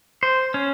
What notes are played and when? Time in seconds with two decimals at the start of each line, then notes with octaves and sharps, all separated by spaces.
0.23 C5
0.54 C#4